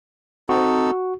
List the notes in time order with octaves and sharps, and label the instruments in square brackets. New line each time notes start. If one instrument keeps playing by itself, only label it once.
[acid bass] C4 [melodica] D#4 A4 [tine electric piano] F#4